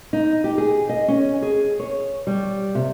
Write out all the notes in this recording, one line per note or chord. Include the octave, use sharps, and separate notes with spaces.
D#4
G4
G#4
D#5
C#4
G#4
C#5
G3
C3